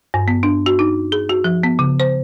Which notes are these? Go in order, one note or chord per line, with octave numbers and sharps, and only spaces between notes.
G2
B3
D4
F#4
D#4
G#4
F#4
F3
B3
C#3
C5